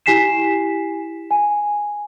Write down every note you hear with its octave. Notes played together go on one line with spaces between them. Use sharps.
E4 G4 G#5 B6 C7 E7
G#5